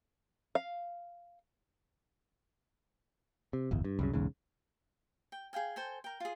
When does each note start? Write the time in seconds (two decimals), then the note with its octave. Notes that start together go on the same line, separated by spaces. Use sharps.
0.55 F5
3.53 C3
3.71 D1 G1 E2
3.84 G2
3.99 C2 F#2 C#3
4.14 B1 E2 G#2 C#3
5.32 G5
5.53 G#4 F5 G5 G#5
5.76 A4 C5 G5 G#5
6.04 A#4 G5
6.20 F4 G#4